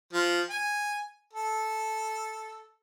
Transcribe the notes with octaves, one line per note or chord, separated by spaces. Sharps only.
F3
G#5
A4